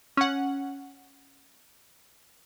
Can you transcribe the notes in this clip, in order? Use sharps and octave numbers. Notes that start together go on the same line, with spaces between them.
C#4 F#5